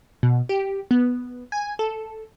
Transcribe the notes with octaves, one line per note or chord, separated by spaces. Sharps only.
B2
G4
B3
G#5
A4